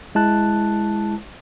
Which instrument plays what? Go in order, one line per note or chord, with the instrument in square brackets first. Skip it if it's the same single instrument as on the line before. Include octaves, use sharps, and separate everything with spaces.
[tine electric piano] G#3 E4 A5 F#6